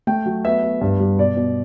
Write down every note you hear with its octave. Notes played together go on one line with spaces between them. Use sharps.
A3 G5
F#3
B3 E5
B3
G2
G3
B2 D5
B2